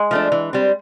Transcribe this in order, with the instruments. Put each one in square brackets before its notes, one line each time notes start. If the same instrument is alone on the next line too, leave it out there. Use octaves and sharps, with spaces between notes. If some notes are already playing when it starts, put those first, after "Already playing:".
Already playing: [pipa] G#3
[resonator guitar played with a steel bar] F3 A3 D4
E3
G3 C4